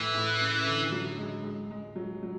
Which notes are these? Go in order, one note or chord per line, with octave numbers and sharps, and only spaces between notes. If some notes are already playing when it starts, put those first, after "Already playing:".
Already playing: A2 E3
A2
C#3
D3
F#3
G#3
G#3
G#3
F#3
F#3